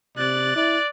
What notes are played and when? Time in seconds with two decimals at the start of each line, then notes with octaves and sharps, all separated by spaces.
0.17 C3 D5 F#6 A6
0.56 E4 D5